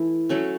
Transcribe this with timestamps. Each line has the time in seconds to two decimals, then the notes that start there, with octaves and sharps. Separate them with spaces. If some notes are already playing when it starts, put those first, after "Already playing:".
Already playing: E3 A3 E4
0.29 F#3 A3 C#4